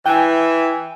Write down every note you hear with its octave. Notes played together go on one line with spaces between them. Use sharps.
E3 G5 G#5